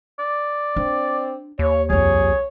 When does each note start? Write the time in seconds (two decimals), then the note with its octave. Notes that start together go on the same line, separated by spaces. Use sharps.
0.19 D5
0.76 C4 D4
1.59 D#2 C#5
1.90 C2 F2 G#4 C#5